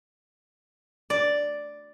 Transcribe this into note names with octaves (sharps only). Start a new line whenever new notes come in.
D5